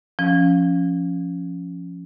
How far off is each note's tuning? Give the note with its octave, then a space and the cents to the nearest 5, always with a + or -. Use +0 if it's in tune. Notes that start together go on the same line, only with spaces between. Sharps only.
F3 +0 C#4 +0